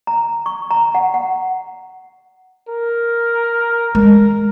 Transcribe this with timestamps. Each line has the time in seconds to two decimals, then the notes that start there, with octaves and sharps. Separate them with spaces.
0.07 A#5
0.46 C#6
0.71 A#5
0.95 F#5
1.14 F#5
2.69 A#4
3.95 G#3 A#4